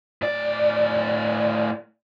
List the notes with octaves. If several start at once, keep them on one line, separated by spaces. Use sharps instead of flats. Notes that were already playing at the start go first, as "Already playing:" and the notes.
A2 D5